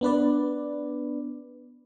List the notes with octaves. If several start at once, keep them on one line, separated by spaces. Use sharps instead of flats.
B3 D4 B4 D5